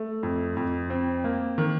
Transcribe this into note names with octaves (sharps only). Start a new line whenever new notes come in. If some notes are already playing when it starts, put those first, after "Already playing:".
Already playing: A3
F2
F2
C4
A#3
D#3